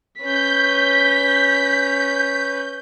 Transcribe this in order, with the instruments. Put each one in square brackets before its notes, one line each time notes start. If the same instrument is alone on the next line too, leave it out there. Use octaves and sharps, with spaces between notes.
[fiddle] C#4 B4 [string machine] G6 [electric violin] B6